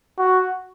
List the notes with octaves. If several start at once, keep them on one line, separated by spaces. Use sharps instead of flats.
F#4